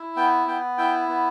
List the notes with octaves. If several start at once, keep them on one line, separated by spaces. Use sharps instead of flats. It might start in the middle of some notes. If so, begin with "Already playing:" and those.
Already playing: E4
B3 G5
B3 G5
E4 G5
B3